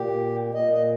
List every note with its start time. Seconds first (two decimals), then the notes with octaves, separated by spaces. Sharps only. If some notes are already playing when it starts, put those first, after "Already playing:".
Already playing: A#2 G4
0.54 A#2 D#5
0.72 D#5